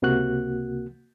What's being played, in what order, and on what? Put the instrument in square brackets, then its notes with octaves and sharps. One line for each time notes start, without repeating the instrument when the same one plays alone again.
[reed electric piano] C#2 C3 A#3 F#4 F#6